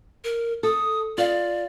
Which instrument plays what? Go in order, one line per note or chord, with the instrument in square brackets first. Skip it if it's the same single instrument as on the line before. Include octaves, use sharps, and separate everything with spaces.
[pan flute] A#4
[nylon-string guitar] A4 [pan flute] D#6
[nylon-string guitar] F4 F5 [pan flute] D5